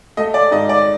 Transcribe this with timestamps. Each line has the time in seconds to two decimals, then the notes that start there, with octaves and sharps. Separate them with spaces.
0.17 A3 D#5
0.34 D5
0.51 G#2 D#5
0.69 D5